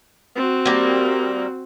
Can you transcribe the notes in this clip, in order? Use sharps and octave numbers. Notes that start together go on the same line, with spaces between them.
C4 F#4
G3 A#3